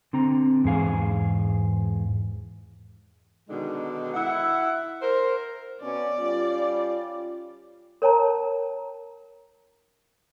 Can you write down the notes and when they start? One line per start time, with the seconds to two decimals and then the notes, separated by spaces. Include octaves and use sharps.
0.13 D3 C4 A#5
0.64 E2 G#2 G#4 F5
3.48 B2 D3 D#3 G#3 D4 D#4
4.14 E4 F#5
5.02 A#4 C5
5.82 B2 B3 C#4 D5
6.19 G3 C#4 F4
8.02 A#4 C#5 G5 A5 A#5